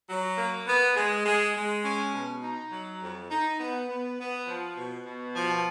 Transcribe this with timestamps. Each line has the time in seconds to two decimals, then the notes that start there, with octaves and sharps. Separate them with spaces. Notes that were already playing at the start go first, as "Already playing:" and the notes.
0.09 F#3
0.37 A#3
0.66 B3
0.95 G#3
1.25 G#3
1.55 G#3
1.84 C#4
2.13 B2
2.43 D#4
2.72 F#3
3.01 F2
3.30 D#4
3.59 B3
3.88 B3
4.19 B3
4.47 F3
4.76 B2
5.05 B2
5.34 F3